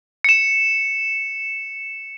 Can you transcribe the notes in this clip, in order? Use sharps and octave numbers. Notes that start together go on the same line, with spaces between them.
C#7 E7